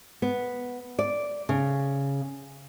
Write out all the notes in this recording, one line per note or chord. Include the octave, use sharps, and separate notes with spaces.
B3
D5
C#3